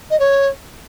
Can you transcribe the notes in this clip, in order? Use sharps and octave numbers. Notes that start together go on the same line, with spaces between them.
D#5
C#5